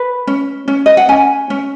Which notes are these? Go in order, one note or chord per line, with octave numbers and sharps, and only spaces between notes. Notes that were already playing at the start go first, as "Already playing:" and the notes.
Already playing: B4
C#4
C#4
D#5
F#5
C#4 G#5
C#4